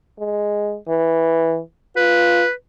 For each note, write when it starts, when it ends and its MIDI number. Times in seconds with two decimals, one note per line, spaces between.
0.19 0.77 56
0.89 1.59 52
1.96 2.44 65
1.96 2.51 71